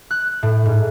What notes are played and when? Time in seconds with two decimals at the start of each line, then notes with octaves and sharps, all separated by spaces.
0.11 F#6
0.43 A2
0.65 G#2